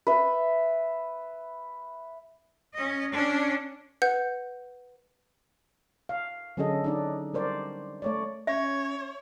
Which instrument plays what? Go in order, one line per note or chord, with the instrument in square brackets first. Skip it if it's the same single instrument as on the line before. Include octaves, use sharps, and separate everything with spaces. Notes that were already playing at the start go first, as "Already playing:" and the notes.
[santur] B4 E5
[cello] C#4 D#5
C#4 D4
[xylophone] B4 F#5 G6
[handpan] F5
D3 F#3 C#4 G#4 A4 D#5
D4 D#4 D5
G3 A#4 C5 D5
A3 C#5 D5
[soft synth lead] C#4 [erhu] C#5 [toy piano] E5